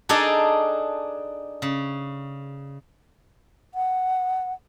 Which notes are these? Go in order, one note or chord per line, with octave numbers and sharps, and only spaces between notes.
D4 D#4 G#4 A4 D5 A#5
C#3
F#5